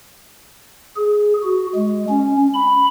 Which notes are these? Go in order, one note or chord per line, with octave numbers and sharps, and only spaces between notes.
G#4
F#4
G#3
C#4
B5